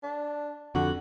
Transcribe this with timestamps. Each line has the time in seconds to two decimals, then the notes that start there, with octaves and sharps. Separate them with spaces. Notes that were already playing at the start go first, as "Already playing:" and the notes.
0.03 D4
0.75 F2 D3 F#4